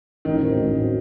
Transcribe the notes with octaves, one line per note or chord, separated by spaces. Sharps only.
A1 D#3
A2 F#3 C4
A1
A2 F#3 C4